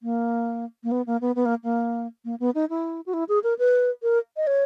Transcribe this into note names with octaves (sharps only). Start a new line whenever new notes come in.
A#3
A#3
B3
A#3
B3
B3
A#3
A#3
A#3
B3
D#4
E4
F#4
E4
G#4
A#4
B4
A#4
D#5
C#5